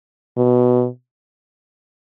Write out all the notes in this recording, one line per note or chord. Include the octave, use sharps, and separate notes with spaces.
B2